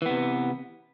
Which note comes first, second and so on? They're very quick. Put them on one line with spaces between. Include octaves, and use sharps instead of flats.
E3 B3 C3